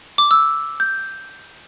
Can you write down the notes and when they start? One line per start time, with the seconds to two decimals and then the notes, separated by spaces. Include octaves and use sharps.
0.18 D6
0.31 E6
0.80 G6